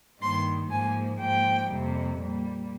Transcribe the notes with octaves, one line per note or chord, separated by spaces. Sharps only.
G2 D#3 A#3 C6
G#2 F3 A#3 G#5
G#2 F3 A#3 G5
F2 C3 G3 A#3
A#2 G3 A#3